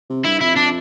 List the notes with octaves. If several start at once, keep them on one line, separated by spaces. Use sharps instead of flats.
C3
G2 E4
F2 E4
D4